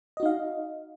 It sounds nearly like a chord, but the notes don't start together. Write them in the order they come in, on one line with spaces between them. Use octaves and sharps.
D#5 F#4 D#4 F5